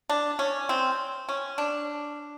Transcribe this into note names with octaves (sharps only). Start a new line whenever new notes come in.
D4
C#4
C4
C#4
D4